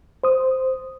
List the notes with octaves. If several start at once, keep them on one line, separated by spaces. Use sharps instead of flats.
C5 D#6